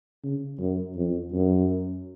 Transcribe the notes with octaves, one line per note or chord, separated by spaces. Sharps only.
C#3
F#2
F2
F#2